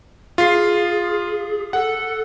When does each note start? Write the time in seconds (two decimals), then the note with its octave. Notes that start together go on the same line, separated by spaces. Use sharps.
0.38 F4 G#4 C7
1.73 A4 F#5